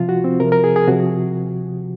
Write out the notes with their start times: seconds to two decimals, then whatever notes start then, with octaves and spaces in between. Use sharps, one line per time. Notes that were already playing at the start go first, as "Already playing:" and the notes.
Already playing: C3 F3 F4
0.09 F#4
0.24 C4
0.40 C3 F3 A#4
0.52 A#4
0.64 G#4
0.76 G#4
0.88 C3 F3 F#4